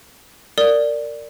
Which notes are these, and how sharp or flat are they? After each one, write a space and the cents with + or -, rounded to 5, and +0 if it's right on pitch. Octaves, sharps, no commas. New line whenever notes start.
A#4 -25 D5 +0 D#6 +0